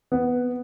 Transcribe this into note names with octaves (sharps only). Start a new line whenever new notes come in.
B3